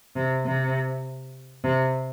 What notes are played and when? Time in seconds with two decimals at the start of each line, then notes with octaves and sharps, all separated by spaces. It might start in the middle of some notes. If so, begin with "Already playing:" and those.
0.16 C3
0.46 C3
1.64 C3